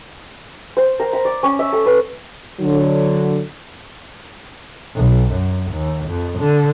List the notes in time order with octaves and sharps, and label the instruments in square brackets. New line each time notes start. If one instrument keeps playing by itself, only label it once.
[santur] C5
A#4
B5
D5
C#4
E5
A4
B4
[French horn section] D3 F#3
[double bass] B1
F#2
D#2
F2
D3